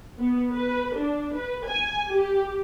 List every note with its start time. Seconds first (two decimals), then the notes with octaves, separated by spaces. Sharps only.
0.19 B3
0.53 B4
0.99 D4
1.37 B4
1.68 G#5
2.09 G4